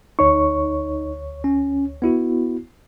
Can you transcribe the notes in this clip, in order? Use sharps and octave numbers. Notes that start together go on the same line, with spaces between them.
D2 D#4 C#5 C#6
C#4
B3 E4 F#4